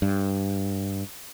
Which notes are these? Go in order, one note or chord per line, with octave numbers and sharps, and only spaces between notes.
G2